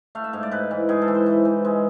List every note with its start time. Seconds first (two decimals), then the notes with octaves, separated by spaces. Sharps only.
0.15 A3 F5
0.24 E5
0.33 G#2 F5
0.43 D5
0.51 G#2 B4
0.71 E3
0.89 G#2 G#4
1.02 A4
1.08 E3
1.15 C5
1.26 E3
1.45 E3
1.65 G#3